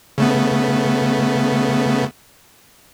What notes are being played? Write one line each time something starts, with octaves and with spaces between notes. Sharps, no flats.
C#3 A3 B3